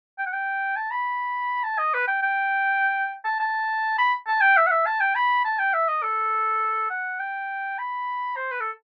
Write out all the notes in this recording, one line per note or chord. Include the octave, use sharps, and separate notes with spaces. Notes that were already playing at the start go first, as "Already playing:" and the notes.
G5
F#5
G5
A5
B5
A5
D#5
B4
G5
G5
A5
A5
B5
A5
G5
E5
F#5
E5
A5
G5
B5
A5
G5
E5
D#5
A4
F#5
G5
B5
C5
B4
A4